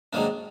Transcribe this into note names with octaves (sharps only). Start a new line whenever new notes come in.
G#2 D#3 F#3 A#3 D4